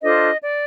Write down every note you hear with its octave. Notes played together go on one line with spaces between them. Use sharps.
D4 F4 A4 C5 D#5
D5